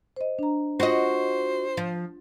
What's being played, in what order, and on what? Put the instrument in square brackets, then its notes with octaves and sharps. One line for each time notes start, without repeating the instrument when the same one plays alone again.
[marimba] C5 D#5
D4 A#5
[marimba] F4 [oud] F#4 D#5 [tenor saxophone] C5
[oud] F3